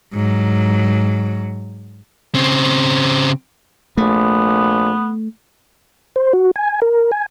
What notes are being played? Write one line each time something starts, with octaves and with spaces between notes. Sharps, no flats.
G#2 F#3
C#3 C4
A#1 A3 B3
C5
F#4
G#5
A#4
G#5